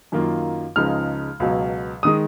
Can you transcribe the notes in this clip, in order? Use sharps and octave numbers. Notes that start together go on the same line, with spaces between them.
F#2 D#3 A#3 F4
C#2 C#3 F3 G#3 D#4 F6
C#2 B2 F#3
D#3 G#3 D#6